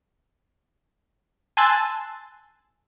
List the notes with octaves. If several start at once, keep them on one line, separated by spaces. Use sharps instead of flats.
G#5 A5 C6 E6 F#6 A6